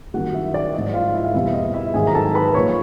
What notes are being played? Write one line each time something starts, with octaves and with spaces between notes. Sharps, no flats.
F#2 D#3 G3 F#4 F#5
E4 E5
D5
G#2 F3 D#5
F4 F5
E4 E5
F5
E2 B2 G3 E4 E5
D#5
E4 E5
G#2 D#3 F#3 G#4 G#5
A#5
A4 A5
B4 B5
A#2 F3 C#5 C#6